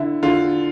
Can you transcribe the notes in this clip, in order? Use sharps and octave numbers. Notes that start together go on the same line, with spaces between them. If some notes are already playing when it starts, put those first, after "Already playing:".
Already playing: D3 E4
D3 F4